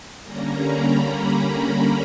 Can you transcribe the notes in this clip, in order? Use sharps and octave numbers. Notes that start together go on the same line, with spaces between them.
D3 G3 A#3 C#4 A#5
B5
B5